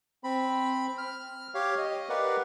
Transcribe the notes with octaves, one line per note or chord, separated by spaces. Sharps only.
C4 B5
F6
G4 C#5 F5
D#5
G4 A#4 B4 D5 F5 F#5